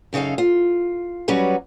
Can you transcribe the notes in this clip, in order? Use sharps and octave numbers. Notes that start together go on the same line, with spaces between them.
F#2 C#3 D#4 A4 F5
F4
F#3 G3 C#4 F#4 B4